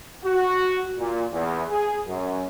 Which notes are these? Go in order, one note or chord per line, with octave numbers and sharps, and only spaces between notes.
F#4
A#2
E2
G#4
F#2